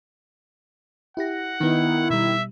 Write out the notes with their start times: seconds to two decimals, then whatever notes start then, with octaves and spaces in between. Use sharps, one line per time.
1.17 E4 G4 F#5 A#6
1.60 D#3 B3 D#4 E4
2.10 B2 G3 E5